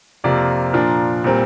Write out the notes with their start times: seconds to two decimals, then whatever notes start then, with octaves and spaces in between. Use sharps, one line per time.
0.24 F2 C3 A#3 F4 D5
0.73 A#2 F3 D4 F4 A#4
1.24 A#2 G3 C4 A#4